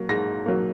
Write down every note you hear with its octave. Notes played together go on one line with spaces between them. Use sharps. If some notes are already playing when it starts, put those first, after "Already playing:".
Already playing: F#3 A#3
G#2 A#6
F#3 A#3